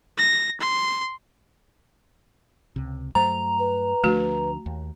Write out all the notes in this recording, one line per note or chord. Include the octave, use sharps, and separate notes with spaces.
A#6
C6
C#2 C3
G2 F#3 A3 C5 A#5
B4
D2 F3 A3 D4 F#4
D#2